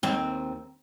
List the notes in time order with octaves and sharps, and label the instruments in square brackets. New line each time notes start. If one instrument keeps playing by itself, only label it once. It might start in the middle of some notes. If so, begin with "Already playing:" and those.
[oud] D#2 C4